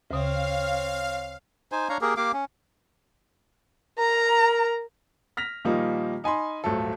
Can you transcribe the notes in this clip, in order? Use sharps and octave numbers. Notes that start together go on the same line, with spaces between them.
D2 C#3 C4 C#5 F5
D#4 C5 G#5
D4 C#5 F5 A#5
A#3 G4 G#4 A#4
A#3 G4 F5 D6
C#4
A#4 A#5
F6 A#6 B6 F7
A#2 D#3 F3 G3 A#3 D#4
D#4 G#5 B5 C6
D#1 G#1 F#3 A3 A4